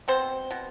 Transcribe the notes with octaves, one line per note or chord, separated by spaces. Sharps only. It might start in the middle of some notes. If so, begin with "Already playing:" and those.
B2 C4 C5
B2